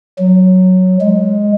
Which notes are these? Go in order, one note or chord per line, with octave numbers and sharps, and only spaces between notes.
F#3
G#3